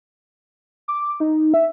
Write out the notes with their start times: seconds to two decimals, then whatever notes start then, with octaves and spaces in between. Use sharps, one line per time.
0.88 D6
1.20 D#4
1.54 E5